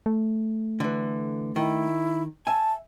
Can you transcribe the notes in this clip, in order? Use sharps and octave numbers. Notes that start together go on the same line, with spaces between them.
A3
D3 E3
D#3 E4
E5 G#5 A5